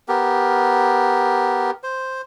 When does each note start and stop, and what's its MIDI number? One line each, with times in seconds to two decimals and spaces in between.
0.08 1.71 59
0.08 1.71 67
0.08 1.71 70
1.83 2.22 72